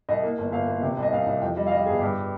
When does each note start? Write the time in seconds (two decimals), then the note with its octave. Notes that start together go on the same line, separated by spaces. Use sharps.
0.09 C2 D#5
0.23 A#3
0.38 G1
0.52 G1 F5
0.68 A#3
0.82 C3
0.97 C2
1.03 D#5
1.12 C2 F5
1.27 C2
1.42 F2 G5
1.56 G3 D#5
1.67 F5
1.71 G3 D#5
1.86 G1 G#4
2.01 G2 G4